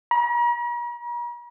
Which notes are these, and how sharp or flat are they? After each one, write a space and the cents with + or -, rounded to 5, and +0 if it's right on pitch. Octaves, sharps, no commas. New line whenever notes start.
A#5 +45